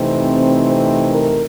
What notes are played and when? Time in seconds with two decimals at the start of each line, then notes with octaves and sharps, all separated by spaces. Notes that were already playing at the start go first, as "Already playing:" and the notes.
Already playing: C3 E3 A3 C4 D#4
0.66 C5
1.11 A#4